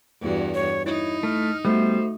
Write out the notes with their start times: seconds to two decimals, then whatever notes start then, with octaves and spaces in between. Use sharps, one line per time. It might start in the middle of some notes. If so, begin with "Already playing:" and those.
0.21 E2 G2 F#4
0.54 C#5
0.86 D#4 E4 C#5
1.23 A3 F6
1.65 G3 A3 B3 F#4 C5